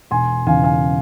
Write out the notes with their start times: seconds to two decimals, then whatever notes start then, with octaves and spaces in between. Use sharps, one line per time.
0.11 E1 G#5 C6
0.46 E2 C#3 F5 G#5
0.64 F5 G#5